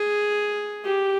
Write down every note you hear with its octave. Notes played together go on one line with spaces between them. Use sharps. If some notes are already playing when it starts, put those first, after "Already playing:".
Already playing: G#4
G4